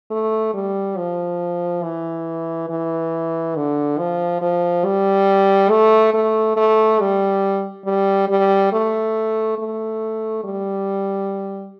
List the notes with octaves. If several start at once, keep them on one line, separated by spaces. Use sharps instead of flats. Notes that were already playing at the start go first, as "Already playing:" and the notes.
A3
G3
F3
E3
E3
D3
F3
F3
G3
A3
A3
A3
G3
G3
G3
A3
A3
G3